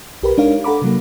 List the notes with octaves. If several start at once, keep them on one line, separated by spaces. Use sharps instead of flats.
B1 G4 A#4 B4 B5
G#3 D4 D#4 A#4 C#5 F5
A4 F#5 A#5 B5 D6
C3 F#3 A#3